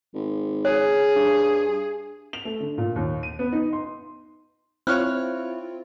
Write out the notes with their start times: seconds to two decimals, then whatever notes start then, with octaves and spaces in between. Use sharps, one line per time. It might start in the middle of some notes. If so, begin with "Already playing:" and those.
0.14 G#1
0.65 G#4 C#5
1.15 G2
2.33 F7
2.45 A3
2.60 D3
2.78 A#2
2.96 D#2
3.23 D#7
3.39 B3
3.53 D#4
3.73 C6
4.87 C4 E4 F4 C#5 F6 F#6